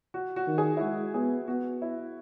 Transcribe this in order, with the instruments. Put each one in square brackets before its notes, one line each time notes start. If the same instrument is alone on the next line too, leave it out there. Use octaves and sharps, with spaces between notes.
[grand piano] F#4
F#4
[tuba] D#3
[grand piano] G#4
E4
[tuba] G#3 [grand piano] F#4
[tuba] B3 [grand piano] G#4
[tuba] B3 [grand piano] F#4
[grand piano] E4